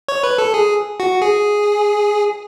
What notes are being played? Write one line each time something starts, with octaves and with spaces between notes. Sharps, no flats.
C#5
B4
A4
G#4
F#4
G#4